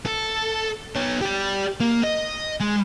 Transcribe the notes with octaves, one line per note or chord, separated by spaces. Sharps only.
A4
B3 C#5
G4 D5
A#3
D#5
G#3